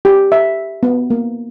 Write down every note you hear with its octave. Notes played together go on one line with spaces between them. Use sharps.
G4
E5
B3
A#3